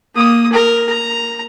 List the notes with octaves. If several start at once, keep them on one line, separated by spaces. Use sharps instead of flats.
A#3 D#6
A#4
A#5